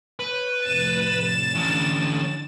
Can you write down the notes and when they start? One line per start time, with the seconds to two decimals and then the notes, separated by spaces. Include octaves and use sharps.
0.20 B4 C#5 G6
0.63 F2 A2 C3 A6 E7
1.55 D3 E3 C#4